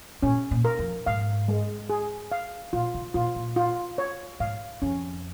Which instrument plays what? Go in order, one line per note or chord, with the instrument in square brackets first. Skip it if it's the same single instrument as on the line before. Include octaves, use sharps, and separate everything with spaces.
[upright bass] A#2 [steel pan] C#4
[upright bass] A#2
[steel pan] A#4
[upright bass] F2
[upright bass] G#2 [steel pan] F5
[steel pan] G#3
G#4
F5
[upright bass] A#2 [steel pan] F4
[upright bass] C#3
[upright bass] A#2 [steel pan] F4
[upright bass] A#2
[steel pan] F4
C#5
[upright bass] G#2 [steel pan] F5
[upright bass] F2 [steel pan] C#4